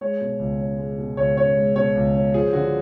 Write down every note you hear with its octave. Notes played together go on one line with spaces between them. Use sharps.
G#3 C#5
B2
C#2
C#4
G#3
B2
C#2 C#5
C#4 C#5
G#3
B2 C#5
C#2
C#4
F3 G#4
D3 F#4